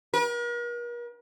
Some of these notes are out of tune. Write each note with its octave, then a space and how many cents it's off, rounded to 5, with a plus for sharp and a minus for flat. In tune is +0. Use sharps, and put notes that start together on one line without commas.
A#4 +45